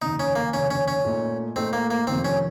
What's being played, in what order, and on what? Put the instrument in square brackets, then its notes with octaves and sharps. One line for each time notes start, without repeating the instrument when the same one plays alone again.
[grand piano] F1 D#2 C#3 [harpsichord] D#4
[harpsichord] C#4
A#3
[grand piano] F1 D#2 C#3 [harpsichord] C#4
[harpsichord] C#4
C#4
[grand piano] A#2 A3 D#4
[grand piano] A#2 A3 D#4 [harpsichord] C4
[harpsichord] A#3
A#3
[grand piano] F2 C3 D#3 [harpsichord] C4
[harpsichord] C#4